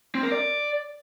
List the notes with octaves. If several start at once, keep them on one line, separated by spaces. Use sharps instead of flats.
C4
A#4
D5